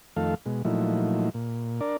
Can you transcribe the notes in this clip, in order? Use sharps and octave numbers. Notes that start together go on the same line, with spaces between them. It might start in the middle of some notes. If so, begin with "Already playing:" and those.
F2 D#3 A3 A4 F5
B2 G#3
A#2 F3 F#3 A3 D#4 E4
A#2
D4 A#4 D5